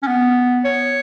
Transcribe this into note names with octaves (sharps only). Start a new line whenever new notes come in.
C#4
B3
C#5